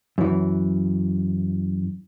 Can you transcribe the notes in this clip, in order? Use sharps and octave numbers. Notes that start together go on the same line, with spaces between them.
F#2 E3